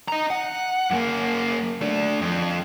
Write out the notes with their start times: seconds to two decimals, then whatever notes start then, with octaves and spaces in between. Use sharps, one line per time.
0.08 D#5 A#5
0.30 F#5
0.91 F#2 A#3
1.82 A3 D4
2.21 F2